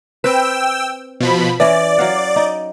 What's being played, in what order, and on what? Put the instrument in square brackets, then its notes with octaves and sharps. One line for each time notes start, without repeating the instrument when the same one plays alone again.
[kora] C4 B4 [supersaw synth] G5 E6
[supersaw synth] B2 F3 B5
[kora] E3 C#4 [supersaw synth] D5
[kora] F#3 F5 F#5
D#4